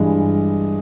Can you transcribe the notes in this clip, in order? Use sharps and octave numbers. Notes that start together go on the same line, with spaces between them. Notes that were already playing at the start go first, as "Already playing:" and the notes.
Already playing: G2 E3 G#3